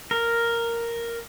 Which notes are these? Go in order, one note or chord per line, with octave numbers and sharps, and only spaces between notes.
A#4